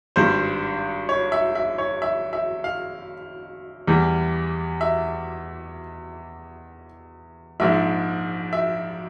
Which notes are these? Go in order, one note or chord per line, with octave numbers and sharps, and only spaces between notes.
G#1 G2 G3 C5
C#5
E5
E5
C#5
E5
E5
F5
E2 E3 G3
E5
A#1 G#2 F3 E5
E5